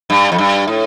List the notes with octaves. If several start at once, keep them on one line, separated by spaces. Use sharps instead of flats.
G2
F2
G2
A2